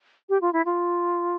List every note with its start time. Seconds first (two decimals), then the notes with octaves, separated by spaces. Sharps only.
0.29 G4
0.41 F4
0.53 E4
0.66 F4